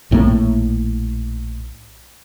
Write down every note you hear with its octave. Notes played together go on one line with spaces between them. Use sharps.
A#1 A2 F3 A#3